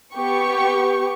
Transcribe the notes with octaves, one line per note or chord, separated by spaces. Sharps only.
B3 G4 C#6